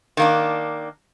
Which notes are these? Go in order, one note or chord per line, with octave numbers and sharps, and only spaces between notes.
D#3 A#3 D4